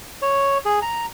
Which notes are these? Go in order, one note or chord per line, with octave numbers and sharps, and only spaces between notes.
C#5
G#4
A#5